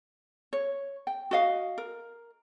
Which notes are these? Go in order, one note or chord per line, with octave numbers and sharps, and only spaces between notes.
C#5
G5
F#4 D#5 F5
A#4